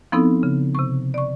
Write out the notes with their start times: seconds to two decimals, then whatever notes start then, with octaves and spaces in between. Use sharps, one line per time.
0.12 F3 B3 C4 D#4 E4 A4
0.43 C#3
0.75 C3 C#6
1.14 D5 C#6